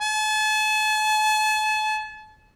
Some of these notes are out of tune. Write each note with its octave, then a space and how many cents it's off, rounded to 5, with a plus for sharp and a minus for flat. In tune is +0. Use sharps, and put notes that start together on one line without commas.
A5 -40